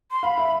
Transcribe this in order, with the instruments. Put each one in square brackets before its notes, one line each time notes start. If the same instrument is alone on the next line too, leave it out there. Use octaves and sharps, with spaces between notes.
[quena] C6
[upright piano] F5 [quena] B5
[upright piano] E5